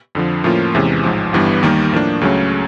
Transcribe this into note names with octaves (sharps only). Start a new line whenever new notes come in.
F2 D3 F3
A2 F3 A#3 C#4 F4
E2 C3 E3 G#3 C#4
A1 G#2 F3
G1 G2 E3 G3 B3
D#2 D#3 G3 A#3
A2 F3 A#3 D4
C#2 C#3 F#3 A3 C#4